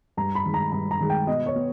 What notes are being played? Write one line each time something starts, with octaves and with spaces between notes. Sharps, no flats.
G2 A#5
B5
D#3 G#3
A#5
G2 A#5
A#5
D#3 G#3
G5
B2 D#5
C#5
B3